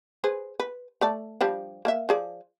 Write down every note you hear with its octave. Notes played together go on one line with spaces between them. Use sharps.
G#4 B4 C5
B4
A3 D5 A5
F3 G3 D4
A#3 A4 E5
F3 G#4 D5